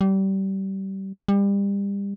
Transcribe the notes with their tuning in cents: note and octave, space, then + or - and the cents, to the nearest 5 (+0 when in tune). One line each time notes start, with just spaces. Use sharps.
G3 -25
G3 +30